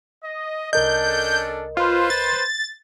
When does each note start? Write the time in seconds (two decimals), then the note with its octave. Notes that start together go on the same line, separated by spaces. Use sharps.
0.23 D#5
0.73 C2 C#4 D4 A4 A#4 D#5 G6
1.77 F4 B4 C5
2.10 A6